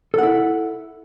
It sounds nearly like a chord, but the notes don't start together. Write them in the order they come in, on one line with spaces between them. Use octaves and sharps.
A4 F#5 E4